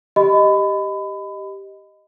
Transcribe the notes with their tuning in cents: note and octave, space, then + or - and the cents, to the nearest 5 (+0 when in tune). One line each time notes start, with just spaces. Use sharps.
G4 +0 D#5 +0 B5 +25